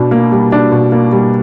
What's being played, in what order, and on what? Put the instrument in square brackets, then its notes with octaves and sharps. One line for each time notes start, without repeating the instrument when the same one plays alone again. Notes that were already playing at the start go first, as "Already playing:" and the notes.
Already playing: [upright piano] B2 D4
A#3
G3
D4
B2
A#3
G3